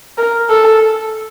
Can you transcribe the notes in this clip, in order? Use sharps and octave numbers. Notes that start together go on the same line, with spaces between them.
A#4
A4